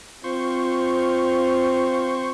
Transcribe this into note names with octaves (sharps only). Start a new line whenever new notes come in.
C4 F4 C5 C#6